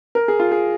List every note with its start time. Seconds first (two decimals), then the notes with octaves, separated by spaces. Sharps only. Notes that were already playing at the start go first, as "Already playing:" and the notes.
0.15 A#4
0.28 G#4
0.39 F4
0.52 G#4